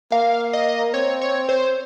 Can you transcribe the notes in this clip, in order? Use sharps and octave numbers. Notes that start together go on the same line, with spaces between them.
A#3 F5
D#5
C4 C#5
C#5
C5